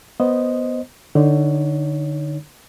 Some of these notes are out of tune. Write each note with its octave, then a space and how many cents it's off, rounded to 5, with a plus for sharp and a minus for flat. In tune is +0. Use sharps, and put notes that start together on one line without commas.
B3 +0 C5 +0 D#5 +0
D3 +15 D#4 +0 C#5 +20